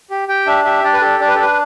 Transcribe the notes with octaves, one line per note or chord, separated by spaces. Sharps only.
G4
G4 G5
D4 E5
G4 E5
D4 D5
B4
G4 A4
D4 D5
B4
A4
D4 B4